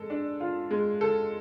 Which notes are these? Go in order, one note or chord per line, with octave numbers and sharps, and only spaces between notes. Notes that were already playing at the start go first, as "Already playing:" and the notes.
Already playing: G#3 A4
D4
F4
G#3
A4